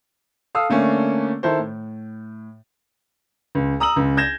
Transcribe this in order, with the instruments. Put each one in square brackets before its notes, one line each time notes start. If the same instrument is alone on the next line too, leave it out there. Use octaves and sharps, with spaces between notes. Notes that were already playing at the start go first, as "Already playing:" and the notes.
[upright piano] A4 F5 D#6 E6
D3 A3 A#3 C#4 D4
D#3 E4 A4 C5
A2
[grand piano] C#2
A#5 D#6 E6 F#7
C#2
G6 G#6 A#6 E7